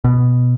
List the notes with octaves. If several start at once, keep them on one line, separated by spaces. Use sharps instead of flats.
B2